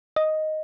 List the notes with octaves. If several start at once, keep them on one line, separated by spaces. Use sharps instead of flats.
D#5